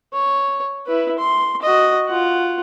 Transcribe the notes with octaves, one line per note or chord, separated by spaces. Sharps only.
C#5
E4 B4
C6
F#4 D#5
F4 F#5